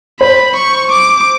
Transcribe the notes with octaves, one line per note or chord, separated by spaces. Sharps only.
C5 B5
C#6
D6